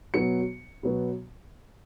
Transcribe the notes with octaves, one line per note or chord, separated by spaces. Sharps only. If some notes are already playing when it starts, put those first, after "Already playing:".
B2 F#3 B3 C#7
B2 F#3 B3